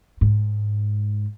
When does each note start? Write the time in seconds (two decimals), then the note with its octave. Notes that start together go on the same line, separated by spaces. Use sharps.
0.21 G#2